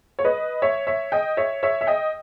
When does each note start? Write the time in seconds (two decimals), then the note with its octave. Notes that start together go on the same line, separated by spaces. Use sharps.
0.19 C#5
0.25 B4 D#5
0.62 C#5 E5
0.87 C#5 E5
1.12 D#5 G5
1.37 C#5 E5
1.63 C#5 E5
1.81 E5
1.87 D#5 G5